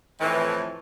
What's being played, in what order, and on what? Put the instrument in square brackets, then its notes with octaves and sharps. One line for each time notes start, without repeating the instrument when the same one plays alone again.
[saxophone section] F2 A2 E3